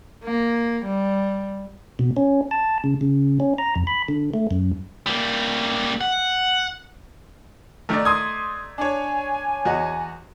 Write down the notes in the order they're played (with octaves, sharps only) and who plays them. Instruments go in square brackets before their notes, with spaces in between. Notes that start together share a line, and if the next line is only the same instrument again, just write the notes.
[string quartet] A#3
G3
[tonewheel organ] B2
C#4
A5
C#3
C#3
C#4
A#5
F2
B5
D3
A3
F#2
[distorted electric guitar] G3 A#3
F#5
[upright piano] D#3 A#4 [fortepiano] A3 D#4 D5
[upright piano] C6 D#6 G#6
[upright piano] D4 C#5 [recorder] G#5
[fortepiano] E2 F#4 D#5